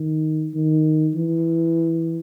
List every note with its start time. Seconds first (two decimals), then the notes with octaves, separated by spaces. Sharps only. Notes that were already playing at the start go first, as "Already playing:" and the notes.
Already playing: D#3
0.54 D#3
1.15 E3